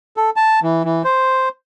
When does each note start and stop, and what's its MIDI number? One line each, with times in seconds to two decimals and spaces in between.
0.17 0.30 69
0.36 0.60 81
0.62 0.83 52
0.85 1.02 52
1.04 1.49 72